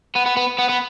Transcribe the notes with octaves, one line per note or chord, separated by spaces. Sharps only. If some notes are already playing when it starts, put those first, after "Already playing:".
B3
B3
B3
B3
B3